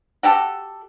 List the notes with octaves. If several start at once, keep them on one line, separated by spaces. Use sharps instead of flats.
F#4 G4 A4